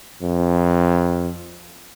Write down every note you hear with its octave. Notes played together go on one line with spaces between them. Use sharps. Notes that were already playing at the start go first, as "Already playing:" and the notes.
F2